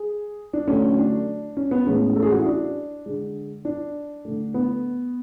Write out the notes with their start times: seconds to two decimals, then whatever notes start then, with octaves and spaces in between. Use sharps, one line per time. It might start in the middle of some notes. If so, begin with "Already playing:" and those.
Already playing: G#4
0.53 D4
0.67 D3 F#3 A3 C#4
0.98 D4
1.57 C#4
1.71 B3
1.86 A2 E3 G#3 C#4
2.16 A4
2.23 G#4
2.30 F#4
2.38 E4
2.46 D4
3.06 D3 G#3
3.65 D4
4.25 D3 A3
4.54 B3